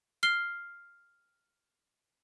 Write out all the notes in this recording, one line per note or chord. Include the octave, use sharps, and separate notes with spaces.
F6 C7 G7